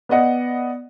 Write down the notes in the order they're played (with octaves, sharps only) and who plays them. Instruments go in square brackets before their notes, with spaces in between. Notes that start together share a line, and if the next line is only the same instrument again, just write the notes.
[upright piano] B3 D5 D#5 F#5